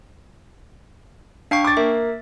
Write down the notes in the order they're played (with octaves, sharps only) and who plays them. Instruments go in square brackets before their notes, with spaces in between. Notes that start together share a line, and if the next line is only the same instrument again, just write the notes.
[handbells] D4 G5 C#6 [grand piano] F5 C7
[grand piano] D6 A6
[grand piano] A#3 [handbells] E5